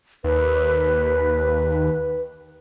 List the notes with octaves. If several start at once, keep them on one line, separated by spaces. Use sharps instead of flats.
D#2 B4